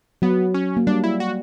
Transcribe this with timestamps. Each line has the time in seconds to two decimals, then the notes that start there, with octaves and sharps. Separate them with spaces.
0.22 F#3 B3
0.54 C#4
0.77 A#3
0.87 G3 D4
1.04 E4
1.20 F#4